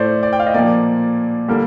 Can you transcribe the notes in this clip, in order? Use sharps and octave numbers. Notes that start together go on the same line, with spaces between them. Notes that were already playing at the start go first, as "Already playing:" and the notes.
Already playing: A2 A3 C5 D5
D5
G5
F5
D#5
A#2 F3 A#3 D5
D3 G3 A#3